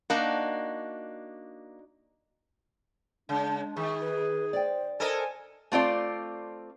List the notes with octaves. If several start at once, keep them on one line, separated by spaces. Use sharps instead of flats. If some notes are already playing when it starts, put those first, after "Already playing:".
A#3 D4 D#4 F#4
C#3 G#3 D4
D#3 G#4 C#6
B4
C5 D5 G5
A4 A#4 C5 D#5 G#5
A3 C4 F4 D5